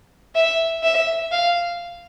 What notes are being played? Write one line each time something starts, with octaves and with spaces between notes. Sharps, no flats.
E5
E5
F5